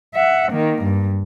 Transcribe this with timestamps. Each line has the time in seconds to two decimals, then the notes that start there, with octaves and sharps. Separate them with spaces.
0.14 E5 F#5
0.52 D#3 A#3
0.83 G2